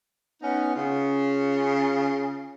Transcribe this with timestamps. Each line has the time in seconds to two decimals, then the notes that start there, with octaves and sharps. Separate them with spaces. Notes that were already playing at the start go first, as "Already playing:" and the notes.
0.42 B3 C#4 D#4
0.75 C#3 C#4 F4